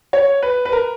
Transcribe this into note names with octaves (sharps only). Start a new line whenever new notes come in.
C#5
B4
B4
A#4